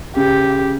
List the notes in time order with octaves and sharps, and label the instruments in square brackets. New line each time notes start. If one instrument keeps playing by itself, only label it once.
[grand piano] C#3 [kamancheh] G4